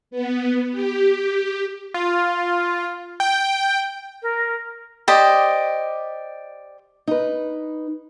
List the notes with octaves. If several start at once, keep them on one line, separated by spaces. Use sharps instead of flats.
B3
G4
F4
G5
A#4
G4 C5 D5 D#5
D#4 B4